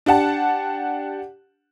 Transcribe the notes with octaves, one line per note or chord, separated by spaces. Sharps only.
D4 G4 F#5 A5